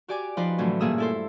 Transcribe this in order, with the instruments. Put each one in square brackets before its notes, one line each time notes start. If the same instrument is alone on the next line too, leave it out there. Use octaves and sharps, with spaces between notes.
[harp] F#4 G4 D5 G#5 D6
F3 D#4 B4 C5 D5
A2 D3 E3 F#3 C#4
G2 A#2 A#3 G#4 D#6 E6
E4 A4 C5